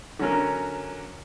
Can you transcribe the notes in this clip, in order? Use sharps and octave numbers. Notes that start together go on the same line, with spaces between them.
D3 F#3 C#4 A#4